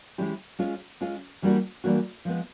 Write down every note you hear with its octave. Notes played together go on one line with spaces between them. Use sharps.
E3 G#3 C#4 E4 G4
G#3 C#4 F4 G#4
G#3 C#4 F4 G#4
E3 G3 A#3 D4 F#4
E3 G3 A#3 D4 F#4
F3 G#3 B3